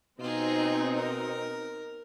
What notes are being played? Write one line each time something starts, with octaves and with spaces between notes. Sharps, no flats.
B2 C4 D#4 F4 G#4
A#4